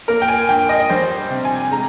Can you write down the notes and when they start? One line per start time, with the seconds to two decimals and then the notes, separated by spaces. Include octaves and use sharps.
0.08 A#3 A#4
0.22 G5
0.28 G#5
0.49 G2 G5
0.69 D#5
0.90 G3 C5
1.30 C3
1.45 G#5
1.71 G#3 A#5